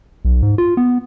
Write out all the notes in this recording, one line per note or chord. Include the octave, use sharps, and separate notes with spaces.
B1
G#2
F4
B3